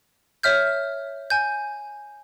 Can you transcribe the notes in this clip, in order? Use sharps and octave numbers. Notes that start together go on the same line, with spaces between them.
C#5 E5 F6 G6
G#5 G6